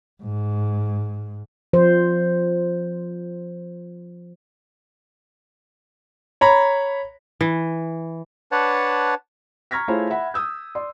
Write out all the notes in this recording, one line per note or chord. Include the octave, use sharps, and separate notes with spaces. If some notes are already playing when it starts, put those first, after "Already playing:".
G#2
F3 C5
C#5 A#5 B5
E3
D4 B4 C#5 F#5 A5
A#5 C#6 F6 G#6 A#6 B6
A3 E4 F4 G#4 C5 C#5
E5 F#5 B5
D#6 E6 G6
D5 C6